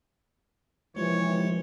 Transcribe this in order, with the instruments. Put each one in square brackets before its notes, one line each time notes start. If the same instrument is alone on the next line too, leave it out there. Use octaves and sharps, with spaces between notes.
[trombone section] D#2 C3 E3 [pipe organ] F3 [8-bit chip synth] G#3 F4 [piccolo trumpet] C#5